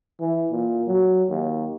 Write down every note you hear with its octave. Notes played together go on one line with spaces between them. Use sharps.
E3
A#2
F#3
D#2